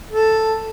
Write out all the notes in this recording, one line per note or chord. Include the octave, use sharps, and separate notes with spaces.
A4